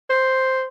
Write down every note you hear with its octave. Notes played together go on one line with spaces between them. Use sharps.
C5